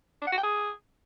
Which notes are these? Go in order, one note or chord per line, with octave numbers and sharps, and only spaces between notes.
D4
F#5
F#4
G5
G#4